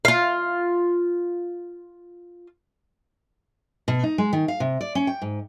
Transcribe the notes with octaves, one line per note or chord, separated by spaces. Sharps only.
F4 F5
B2
D#4
G#3
D#3
F5
C3
D5
C#4
G5
G#2